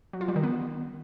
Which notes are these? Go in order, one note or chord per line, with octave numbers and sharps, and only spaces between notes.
F#3
F4
G3
D#3
B3